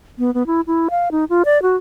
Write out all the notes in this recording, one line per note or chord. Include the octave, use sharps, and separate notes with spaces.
B3
B3
E4
E4
F5
D#4
F4
D5
F#4